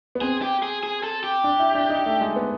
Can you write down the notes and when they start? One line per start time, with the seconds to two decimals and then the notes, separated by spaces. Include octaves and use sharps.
0.15 B3
0.21 C4 G#4
0.42 G4
0.63 G#4
0.83 G#4
1.03 A4
1.24 G4
1.44 D4
1.59 E4
1.75 D4
1.90 D#4
2.06 A3
2.21 G#3
2.36 B3